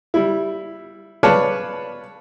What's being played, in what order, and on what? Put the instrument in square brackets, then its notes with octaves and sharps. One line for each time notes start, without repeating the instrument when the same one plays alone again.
[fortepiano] G3 E4
B4 C#5 D5 F5 A5 B5